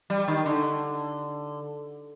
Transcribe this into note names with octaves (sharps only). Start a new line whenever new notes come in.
G3
D#3
D3